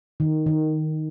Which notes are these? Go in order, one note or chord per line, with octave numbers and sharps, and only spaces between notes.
D#3
D#3